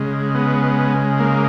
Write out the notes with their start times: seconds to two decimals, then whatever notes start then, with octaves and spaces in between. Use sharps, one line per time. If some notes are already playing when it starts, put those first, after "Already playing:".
Already playing: C#3 G#3
0.35 B3
1.20 A#3